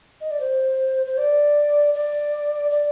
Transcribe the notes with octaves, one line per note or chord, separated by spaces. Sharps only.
D#5
D5
C5
C5
D5
D5
D5